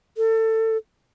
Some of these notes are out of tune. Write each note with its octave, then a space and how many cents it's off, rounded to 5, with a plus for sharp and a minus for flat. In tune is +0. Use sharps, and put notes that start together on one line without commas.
A4 +25